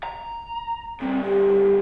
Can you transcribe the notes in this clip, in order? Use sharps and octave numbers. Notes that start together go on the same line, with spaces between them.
A#5
D2 G3 C4
G4